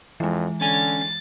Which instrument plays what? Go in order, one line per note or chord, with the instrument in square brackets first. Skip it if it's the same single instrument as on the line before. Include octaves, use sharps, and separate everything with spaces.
[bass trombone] F2 [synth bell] E3 G#3
[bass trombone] D3 [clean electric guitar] C#4 G#5 [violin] A6